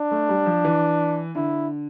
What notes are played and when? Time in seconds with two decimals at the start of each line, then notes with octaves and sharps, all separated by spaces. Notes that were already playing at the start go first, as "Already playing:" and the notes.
Already playing: D4
0.11 A3
0.29 G3
0.46 F3
0.65 E3
1.35 D3 E4